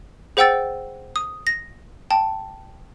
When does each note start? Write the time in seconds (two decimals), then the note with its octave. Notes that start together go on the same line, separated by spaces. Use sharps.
0.37 G#4 C5 F#5 G5 E6 A6
1.16 D#6
1.47 A#6
2.11 G5 A5